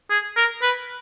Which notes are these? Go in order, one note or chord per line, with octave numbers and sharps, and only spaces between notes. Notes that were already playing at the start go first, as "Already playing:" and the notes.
G#4
A#4
B4